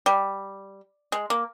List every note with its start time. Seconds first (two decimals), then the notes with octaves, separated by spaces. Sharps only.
0.06 G3
1.12 G#3
1.30 A#3